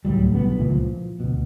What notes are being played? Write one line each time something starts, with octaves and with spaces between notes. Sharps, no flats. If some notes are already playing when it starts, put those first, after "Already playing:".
D2 A2 F#3 G3
B1 D3 G3 B3
C#2 A#2 E3
F3
D2 B2